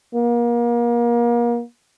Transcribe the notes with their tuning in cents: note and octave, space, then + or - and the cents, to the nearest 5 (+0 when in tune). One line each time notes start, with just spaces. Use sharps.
A#3 +30